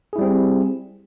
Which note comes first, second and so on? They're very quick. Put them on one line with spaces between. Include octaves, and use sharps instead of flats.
G#4 E4 G3 C4